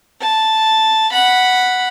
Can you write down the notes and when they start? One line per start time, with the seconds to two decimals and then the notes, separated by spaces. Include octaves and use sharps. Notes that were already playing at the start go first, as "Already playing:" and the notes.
0.22 A5
1.12 F#5 B5